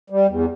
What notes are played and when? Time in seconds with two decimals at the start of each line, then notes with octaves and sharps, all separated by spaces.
0.10 G3
0.29 E2